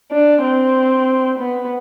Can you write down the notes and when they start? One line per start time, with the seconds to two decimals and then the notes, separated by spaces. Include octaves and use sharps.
0.11 D4
0.43 C4
1.39 B3